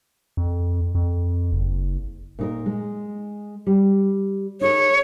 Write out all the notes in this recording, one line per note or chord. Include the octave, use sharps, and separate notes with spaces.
F2
F2
F#1
A#2 D#4 A#4
G#3
G3
D#4 G#4 A#4 C#5